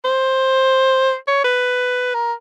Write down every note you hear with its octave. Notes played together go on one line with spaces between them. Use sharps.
C5
C#5
B4
A#4